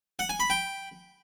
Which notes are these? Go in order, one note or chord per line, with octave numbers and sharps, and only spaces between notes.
F#5
G#5
B5
G5